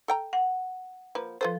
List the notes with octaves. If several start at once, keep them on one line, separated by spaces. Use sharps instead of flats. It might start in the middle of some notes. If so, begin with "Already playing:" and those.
A4 G5 A#5
F#5
F3 A#3 B4
F3 F4 A4 B4 C5